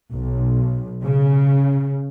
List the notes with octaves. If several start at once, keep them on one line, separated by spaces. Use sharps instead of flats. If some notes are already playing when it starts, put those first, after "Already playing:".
B1
C#3